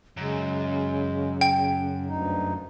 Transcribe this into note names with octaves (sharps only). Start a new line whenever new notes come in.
F#2 C#3 G#3
G5
D2 G2 D#4